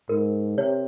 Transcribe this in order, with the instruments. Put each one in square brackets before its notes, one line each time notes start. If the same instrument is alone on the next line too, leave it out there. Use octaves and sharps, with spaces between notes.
[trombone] G#2 [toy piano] A#4
[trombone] C3 [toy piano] C#5